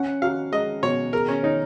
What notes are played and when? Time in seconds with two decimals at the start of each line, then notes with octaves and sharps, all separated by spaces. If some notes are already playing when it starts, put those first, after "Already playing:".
Already playing: C#4 F#5
0.22 F#4 F5
0.52 G#3 D#5
0.83 B2 C#5
1.13 G#4 A#4
1.28 C#4
1.43 D#4 C#5